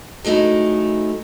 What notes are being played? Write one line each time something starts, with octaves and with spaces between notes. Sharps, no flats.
F#3 G#3 A3 D#4 E4